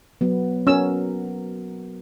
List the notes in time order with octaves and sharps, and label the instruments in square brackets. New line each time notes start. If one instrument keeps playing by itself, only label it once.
[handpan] F#3 B3
[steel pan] C#4 E6 [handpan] F#4 A#4